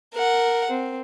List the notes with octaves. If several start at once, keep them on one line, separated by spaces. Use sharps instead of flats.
A#4 F#5
C4